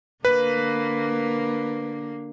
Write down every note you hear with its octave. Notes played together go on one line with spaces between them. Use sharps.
D3 A#3 B4